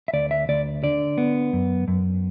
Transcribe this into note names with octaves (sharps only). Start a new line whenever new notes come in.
E5
D2 D5
E5
D2 D5
D3 D5
B3
F#2
F#2